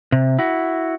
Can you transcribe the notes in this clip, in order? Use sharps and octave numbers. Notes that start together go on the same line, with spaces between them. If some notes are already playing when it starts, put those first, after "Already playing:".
C3
E4 F#4